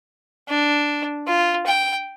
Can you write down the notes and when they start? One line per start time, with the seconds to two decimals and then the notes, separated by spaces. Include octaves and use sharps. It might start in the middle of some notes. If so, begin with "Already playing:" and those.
0.48 D4
1.27 F4
1.66 G5